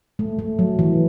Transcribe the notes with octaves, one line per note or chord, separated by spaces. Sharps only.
A3
A3
F#3
E3